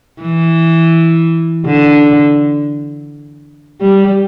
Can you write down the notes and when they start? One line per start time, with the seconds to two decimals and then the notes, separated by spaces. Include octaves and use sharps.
0.22 E3
1.66 D3
3.81 G3